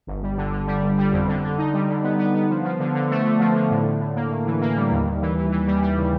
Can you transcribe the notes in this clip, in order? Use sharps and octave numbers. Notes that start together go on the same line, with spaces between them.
G1
G3
D3
D3
G3
G1
G3
F2
D3
D3
D#4
G3
D3
B3
B3
B3
F3
F3
D3
D3
A3
D3
F3
D3
A2
A2
A2
A#3
A2
E3
A#3
G3
D#2
D#2
E3
E3
E3
G3
G3
C#3